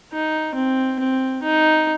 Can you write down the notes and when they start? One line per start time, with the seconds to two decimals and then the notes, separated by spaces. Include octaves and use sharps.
0.12 D#4
0.55 C4
0.99 C4
1.43 D#4